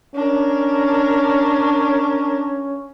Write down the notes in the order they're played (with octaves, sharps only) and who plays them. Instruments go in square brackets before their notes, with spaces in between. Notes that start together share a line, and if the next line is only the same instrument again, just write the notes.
[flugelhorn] C#4 [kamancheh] D4 A#4